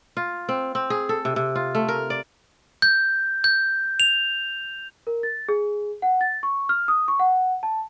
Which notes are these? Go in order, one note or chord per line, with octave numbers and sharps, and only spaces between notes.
F4
C4
C4
G#4
A4
C3
C3
F4
A3
A#4
D5
G6
G6
F7
A#4
A6
G#4
F#5
A6
C#6
F6
D#6
C#6
F#5
A5